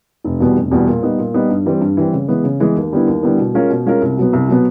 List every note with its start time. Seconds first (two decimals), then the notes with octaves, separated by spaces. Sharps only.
0.24 F1
0.40 E2 B2 G3 B3
0.56 F1
0.71 E2 B2 G3 B3
0.87 A#2
1.03 G3 B3 D#4
1.18 A#2
1.34 G3 B3 D#4
1.50 G2
1.66 E3 G3 C4
1.81 G2
1.97 E3 G3 C4
2.13 C#3
2.28 E3 G#3 B3
2.44 C#3
2.60 E3 G#3 B3
2.76 D#2
2.92 D3 G3 B3 E4
3.07 D#2
3.23 D3 G3 B3 E4
3.38 B2
3.54 G#3 C#4 F4 A#4
3.70 B2
3.86 G#3 C#4 F4 A#4
4.01 C2
4.17 B2 F#3 B3
4.33 C2
4.48 B2 F#3 B3